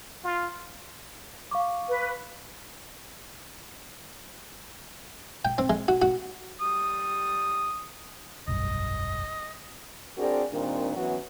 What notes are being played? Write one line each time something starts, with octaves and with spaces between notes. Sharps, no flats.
F4
F5 C#6 D6
B4
G5
C4
G#3
F#4
F#4
G3 D#6
F1 B1 G2 D#5
C4 D4 F#4 G#4 A#4 D5
A#2 D#3 G3 C4 D4
E3 F#3 B3 C#4 F#4